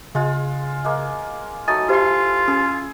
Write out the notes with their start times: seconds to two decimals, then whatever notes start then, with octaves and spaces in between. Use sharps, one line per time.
0.15 C#3 G#3 F4
0.84 G#3 A#3
1.68 F#3 A3 D#4 G#5 D#6 A6
1.89 E4 F4 G4 C5 C6
2.48 C#4 G#4